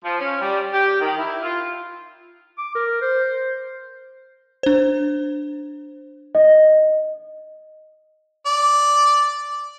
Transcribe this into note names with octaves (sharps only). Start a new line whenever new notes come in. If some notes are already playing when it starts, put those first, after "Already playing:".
F3
C#4
G3
G4
D#3
E4
F4
D6
A#4
C5
D4 C5
D#5
D5